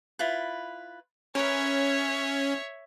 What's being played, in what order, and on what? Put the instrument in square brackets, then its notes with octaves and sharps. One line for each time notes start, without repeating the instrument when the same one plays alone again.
[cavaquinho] E4 F4 B4
[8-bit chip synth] C#4 [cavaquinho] A#4 B4 [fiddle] C#5 E5